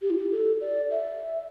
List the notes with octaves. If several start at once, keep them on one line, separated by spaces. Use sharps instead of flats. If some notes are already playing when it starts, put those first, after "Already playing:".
G4
E4
G4
A4
D5
E5